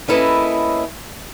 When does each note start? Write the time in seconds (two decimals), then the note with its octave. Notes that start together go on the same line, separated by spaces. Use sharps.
0.08 A#3 C#4 E4 A4 B4 D#5